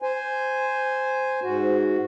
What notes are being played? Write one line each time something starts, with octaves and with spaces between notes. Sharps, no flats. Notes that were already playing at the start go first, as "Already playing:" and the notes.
C5 G#5
G#2 F#4